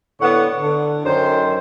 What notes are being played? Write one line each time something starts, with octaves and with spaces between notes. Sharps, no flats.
A2 D3 B3 C#5 F#5
D3
F#2 D#3 C5